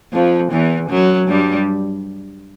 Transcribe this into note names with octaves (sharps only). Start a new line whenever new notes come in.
F2 F3
E2 E3
F#2 F#3
G2 G3